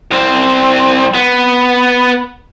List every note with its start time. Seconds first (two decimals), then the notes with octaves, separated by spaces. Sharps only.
0.11 C2 C4
1.15 B3